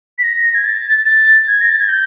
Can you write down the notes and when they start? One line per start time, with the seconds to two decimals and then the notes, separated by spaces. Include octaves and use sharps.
0.18 B6
0.23 A#6
0.55 G#6
0.65 A6
1.06 A6
1.48 G#6
1.61 A#6
1.70 A6
1.79 G#6
1.88 G6